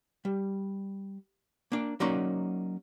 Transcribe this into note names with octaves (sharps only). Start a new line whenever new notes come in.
G3
A#3 D4
F#3 A#3 C#4 D#4 D5 C6